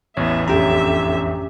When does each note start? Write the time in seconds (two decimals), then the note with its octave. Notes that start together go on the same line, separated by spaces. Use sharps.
0.17 A1 E2 B3 C#5 E5
0.48 F2 D3 C#4 G4 E5 G5 A#5